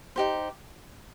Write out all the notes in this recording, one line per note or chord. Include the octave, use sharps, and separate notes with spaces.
D#4 G4 C5